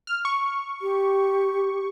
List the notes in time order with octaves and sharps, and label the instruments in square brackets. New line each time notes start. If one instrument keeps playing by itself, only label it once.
[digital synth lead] F6
C#6
[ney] G4